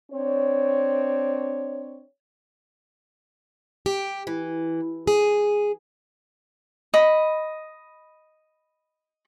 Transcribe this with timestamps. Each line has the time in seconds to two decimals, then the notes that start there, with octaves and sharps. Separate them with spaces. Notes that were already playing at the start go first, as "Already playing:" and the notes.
0.11 C4 D4 C#5
3.86 G4
4.27 E3
5.07 G#4
6.94 D#5 B5